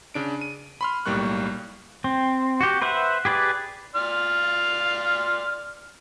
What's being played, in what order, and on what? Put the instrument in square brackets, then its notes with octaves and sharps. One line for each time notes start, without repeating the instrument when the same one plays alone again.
[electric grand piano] C#3 D4 D7
D#7
B5 C6 F6
B1 A2 G3 A#3 C#6 F#6
[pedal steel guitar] C4
F#4 G4
B4 C5 E5 F#5
G4 G#4 B4 D5
[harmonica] D5 C6 F6